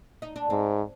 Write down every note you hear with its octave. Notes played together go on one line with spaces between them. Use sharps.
D#4
D4
G#2 C4